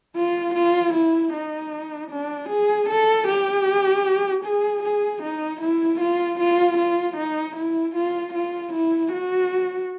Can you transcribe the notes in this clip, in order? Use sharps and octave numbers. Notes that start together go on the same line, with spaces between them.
F4
F4
E4
D#4
D4
G#4
A4
G4
G#4
G#4
D#4
E4
F4
F4
F4
D#4
E4
F4
F4
E4
F#4